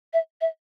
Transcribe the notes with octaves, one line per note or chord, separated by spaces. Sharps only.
E5
E5